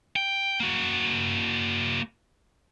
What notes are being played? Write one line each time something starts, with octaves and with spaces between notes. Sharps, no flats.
G5
A#3 F#4